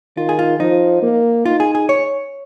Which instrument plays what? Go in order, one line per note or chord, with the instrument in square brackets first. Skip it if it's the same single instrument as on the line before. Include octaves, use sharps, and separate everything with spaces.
[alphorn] D#3 [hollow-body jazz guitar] F4
[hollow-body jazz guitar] G#4
F4
[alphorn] F3 [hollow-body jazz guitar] D#4
[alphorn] A#3
[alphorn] D#4 [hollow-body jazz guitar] F4
[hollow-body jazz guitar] G#4
G#4
C#5